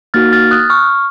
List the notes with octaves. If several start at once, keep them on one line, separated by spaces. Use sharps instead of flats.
A#3 D#4 F#4 F6 A6
F6 A6
D#6 F#6
C#6 F6